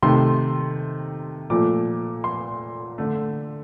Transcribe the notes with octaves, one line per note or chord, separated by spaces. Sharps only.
C3 D#3 A3 C6
A#2 F3 A3 D6
C6
D3 A3